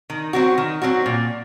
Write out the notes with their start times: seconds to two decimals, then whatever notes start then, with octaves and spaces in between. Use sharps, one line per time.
0.10 D#3
0.33 F#3 C4 F#4
0.58 D#3
0.82 F#3 C4 F#4
1.06 A#2